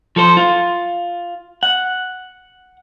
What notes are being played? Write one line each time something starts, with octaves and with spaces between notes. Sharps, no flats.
F3 A4 C5
F4
F#5